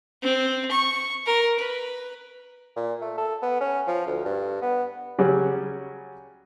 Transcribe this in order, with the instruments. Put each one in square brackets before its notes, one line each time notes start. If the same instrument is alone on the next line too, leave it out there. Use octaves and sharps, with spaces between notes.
[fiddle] C4
C#6
A#4
B4
[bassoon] A#2
A3
A4
B3
C#4
F3
D2
G2
B3
[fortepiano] C#3 F#3 G3 C#4